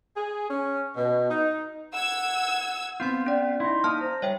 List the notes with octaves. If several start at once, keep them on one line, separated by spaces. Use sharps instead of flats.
G#4
C#4
B2
D#4
F#5 E6 G#6
B3 C4 F4 C6 G6
C#4 D5 G5
D#4 E4 C6
A#3 D#4 A5 D#6 F6
C5 A#5
G3 C#5 E5 G5